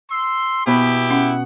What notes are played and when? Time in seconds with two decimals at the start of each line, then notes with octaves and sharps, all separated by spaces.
0.11 C6 E6
0.67 B2 E4 G4 B5
1.10 C#4 F#5